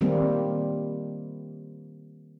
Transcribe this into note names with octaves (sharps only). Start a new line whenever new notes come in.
D#3 G3 A#3 C4